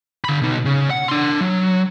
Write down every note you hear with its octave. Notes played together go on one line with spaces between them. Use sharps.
D3 B5
B2 D#4
C#3
F#5
D4 C6
F#3